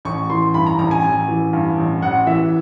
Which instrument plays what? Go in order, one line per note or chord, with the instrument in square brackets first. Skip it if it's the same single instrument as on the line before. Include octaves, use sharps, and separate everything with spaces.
[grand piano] A1 C#6
E3 C6
G2 B5
A#5
A1 A#5
G#5
A1
E3
G2
A1
A1 F#5
E3 E5